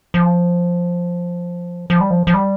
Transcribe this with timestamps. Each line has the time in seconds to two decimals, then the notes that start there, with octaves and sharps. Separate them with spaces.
0.14 F3
1.90 F3
2.01 G3
2.10 F3
2.27 F3
2.34 G3